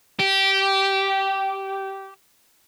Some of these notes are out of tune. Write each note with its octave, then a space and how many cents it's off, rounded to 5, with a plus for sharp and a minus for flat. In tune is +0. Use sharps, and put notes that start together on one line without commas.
G4 -15